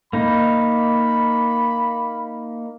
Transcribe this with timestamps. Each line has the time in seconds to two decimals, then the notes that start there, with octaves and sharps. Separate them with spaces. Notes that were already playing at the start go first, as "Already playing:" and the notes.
0.13 A#3 D#4 B5